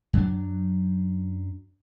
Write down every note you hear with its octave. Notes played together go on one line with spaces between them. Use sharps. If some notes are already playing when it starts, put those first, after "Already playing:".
F#2 F#3 D4